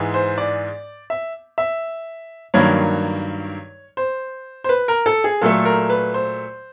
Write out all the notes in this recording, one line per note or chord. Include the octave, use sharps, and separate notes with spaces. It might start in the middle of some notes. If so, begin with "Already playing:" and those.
Already playing: G#2 E3 G#3
C5
D5
E5
E5
G2 D#3 F#3 A#3 C#5
C5
C5
B4
A#4
A4
G#4
A#2 F#3 A3 A4
A#4
B4
C5